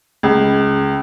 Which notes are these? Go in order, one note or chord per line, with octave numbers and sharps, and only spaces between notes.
C#2